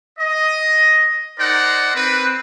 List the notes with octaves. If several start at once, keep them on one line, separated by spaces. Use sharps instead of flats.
D#5
D#4 A#4 C5 D5 F#5
C4 B4